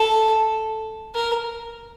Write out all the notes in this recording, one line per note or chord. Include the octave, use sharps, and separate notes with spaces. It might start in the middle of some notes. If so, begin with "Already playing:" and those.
Already playing: A4
A#4